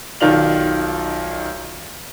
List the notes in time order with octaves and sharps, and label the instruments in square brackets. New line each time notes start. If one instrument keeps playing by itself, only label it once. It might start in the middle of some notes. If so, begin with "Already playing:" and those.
[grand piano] B1 D#3 F4 D5 F7 F#7